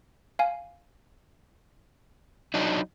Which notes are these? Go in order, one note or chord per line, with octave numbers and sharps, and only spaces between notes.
F5 G#5
F#3 D4 D#4